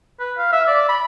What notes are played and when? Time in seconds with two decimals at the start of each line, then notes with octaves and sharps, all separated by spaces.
0.19 B4
0.38 F5
0.52 E5
0.68 D5
0.88 B5